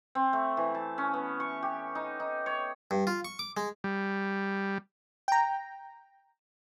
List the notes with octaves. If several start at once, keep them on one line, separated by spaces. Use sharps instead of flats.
C4
A3
E3
A5
C#4
B3
C#6
G4
D#4
D#4
C#5
G2
F4
C#6
D6
G#3
G3
G5 A#5